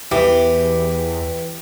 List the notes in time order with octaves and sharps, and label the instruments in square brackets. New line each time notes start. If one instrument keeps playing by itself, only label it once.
[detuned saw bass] E2 [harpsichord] E3 [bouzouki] G4